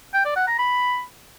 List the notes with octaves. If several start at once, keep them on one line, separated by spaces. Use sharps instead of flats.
G5
D5
F#5
A#5
B5